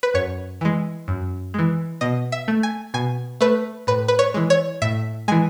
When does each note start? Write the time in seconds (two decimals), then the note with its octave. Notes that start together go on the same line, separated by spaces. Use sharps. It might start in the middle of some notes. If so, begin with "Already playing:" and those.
0.03 B4
0.14 F#2 C#5
0.61 E3 G#3
1.08 F#2
1.54 E3 G#3
2.01 B2 D#5
2.32 E5
2.48 A3
2.63 G#5
2.94 B2 G#5
3.41 A3 B4
3.87 A2 B4
4.08 B4
4.19 C#5
4.34 E3 G#3
4.50 C#5
4.82 A2 E5
5.28 E3 G#3 G#5